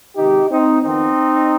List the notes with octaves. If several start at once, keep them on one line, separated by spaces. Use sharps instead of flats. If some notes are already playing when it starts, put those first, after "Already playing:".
C3 D#3 G#3 D#4 G4
C4 D#4
F2 D#3 B3 C4 D#4